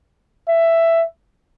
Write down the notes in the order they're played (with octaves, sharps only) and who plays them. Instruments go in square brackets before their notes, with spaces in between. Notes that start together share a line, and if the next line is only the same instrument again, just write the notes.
[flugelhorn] E5